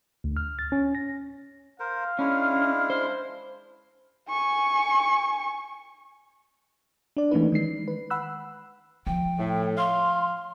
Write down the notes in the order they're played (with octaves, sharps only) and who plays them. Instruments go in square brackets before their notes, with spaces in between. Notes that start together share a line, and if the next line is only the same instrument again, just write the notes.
[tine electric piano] D2
F6
A6
C#4
A#6
[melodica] A#4 C5 [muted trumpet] F5
[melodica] G#3 D4 E4 [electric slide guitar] C#4
[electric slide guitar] C5
[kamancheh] G#5 C#6
[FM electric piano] D4 D5
E3 A3 A#3 C#4 D#4 B4
D#3 G#3 C7
B4
F#5 B5 E6 F#6
[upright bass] F3 [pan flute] G5
[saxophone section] A2
[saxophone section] F5 [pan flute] C6